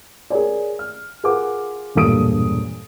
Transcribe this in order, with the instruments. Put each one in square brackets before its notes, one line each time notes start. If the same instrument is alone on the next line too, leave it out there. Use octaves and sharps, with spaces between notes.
[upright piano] G#4 A#4 C#5 D5
F6
F4 G#4 A#4 B4 F#5 D6
E1 G2 A#2 A4 D#6 D7